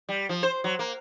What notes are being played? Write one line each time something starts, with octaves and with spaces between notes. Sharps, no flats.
G3
F3
C5
F#3
A#3